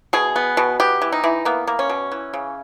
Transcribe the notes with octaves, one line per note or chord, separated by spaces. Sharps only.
B2 G#4
B3
B2
B3 G4
E3
D#4
E3
A#3 B3
A#3
C#4
B2
E3
C#3